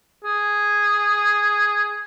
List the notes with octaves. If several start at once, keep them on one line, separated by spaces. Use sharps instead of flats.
G#4